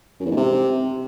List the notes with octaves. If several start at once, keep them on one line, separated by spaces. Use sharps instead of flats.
F#2
E2
G#2
C3